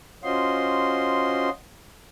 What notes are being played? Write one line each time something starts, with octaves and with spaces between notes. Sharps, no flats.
C#4 F4 F#4 C5 D#5 C6